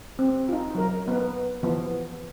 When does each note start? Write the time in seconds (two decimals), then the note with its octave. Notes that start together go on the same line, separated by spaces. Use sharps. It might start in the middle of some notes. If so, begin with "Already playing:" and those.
0.19 C4
0.49 D#4 F4
0.75 F#3 A#4
1.08 B3 B4
1.63 E3 F3 B3